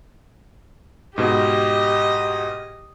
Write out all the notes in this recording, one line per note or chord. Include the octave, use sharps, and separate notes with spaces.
G#2 B2 G4 D#5